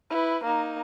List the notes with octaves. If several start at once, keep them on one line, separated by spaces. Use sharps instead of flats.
E4 B4
A#3 D#4